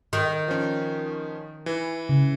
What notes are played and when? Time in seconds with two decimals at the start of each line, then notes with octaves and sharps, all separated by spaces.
0.13 D#3
0.48 F3 C#4
1.66 E3
2.09 C#3